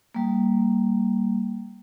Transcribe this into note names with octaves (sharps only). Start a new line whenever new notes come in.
G3 A#3